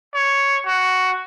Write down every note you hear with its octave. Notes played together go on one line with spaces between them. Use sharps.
C#5
F#4